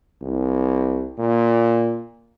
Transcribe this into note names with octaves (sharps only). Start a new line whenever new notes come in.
C2
A#2